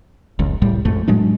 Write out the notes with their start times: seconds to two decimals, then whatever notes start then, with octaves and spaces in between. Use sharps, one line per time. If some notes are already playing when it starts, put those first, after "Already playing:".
0.39 F1 C#2
0.62 C2 A2 G3
0.85 A1 F2 G#2 A3
1.08 A2 F#3 G#3 D4